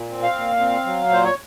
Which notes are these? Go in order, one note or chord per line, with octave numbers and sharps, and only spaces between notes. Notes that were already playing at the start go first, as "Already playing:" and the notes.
Already playing: A#2
C4
F5
A#2
C4
F#3
A#2 C5
C#5